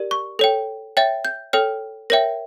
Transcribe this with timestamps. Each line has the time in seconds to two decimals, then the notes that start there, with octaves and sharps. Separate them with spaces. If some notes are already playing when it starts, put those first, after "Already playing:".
Already playing: G4 A#4 D5
0.11 C#6
0.39 A4 C#5 G5
0.97 C#5 E5 G5 A6
1.25 G6
1.53 A4 C#5 G5 F6
2.10 A#4 C#5 E5 G5 A#6